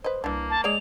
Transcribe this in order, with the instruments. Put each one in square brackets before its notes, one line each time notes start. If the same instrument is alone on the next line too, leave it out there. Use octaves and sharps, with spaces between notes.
[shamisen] B4 D#5 [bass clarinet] C5
[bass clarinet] C2 [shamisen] E3 D4 [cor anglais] A#3
[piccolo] A5
[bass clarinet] G#3 [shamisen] G#4 C#5 D5 [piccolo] F7